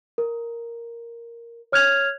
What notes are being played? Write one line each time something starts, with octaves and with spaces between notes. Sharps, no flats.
A#4
C#5 F6 F#6 G#6 F7